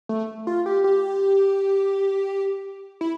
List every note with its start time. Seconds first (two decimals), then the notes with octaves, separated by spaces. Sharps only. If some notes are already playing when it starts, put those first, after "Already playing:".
0.09 A3
0.47 F4
0.66 G4
0.84 G4
3.01 E4